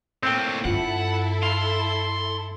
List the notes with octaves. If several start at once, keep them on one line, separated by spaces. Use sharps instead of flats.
A2 A#3 C4 G5
G2 E4 F4 A4 F#5
F5 C6